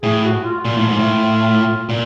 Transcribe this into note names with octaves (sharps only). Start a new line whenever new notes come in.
A2 G#4
F#4
F4
A#2
A2
G#2
A2
A#2